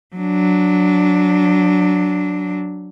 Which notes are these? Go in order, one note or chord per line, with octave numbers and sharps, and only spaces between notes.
F#3 D4